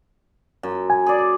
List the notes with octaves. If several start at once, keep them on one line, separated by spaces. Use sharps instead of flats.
F#2
G#5
G#4 D5